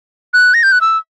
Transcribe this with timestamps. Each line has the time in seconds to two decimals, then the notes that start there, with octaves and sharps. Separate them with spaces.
0.34 F#6
0.54 A#6
0.63 G6
0.72 F#6
0.81 E6